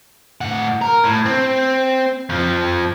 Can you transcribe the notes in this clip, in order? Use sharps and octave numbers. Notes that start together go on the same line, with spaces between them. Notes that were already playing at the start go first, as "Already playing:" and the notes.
A2 F#5
A#4
A2
C4
F2 F3